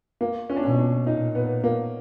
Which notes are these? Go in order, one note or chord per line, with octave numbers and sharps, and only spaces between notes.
A#3
C#4
D4
B2 C#4
D4
A#2 D#4
B3
A#3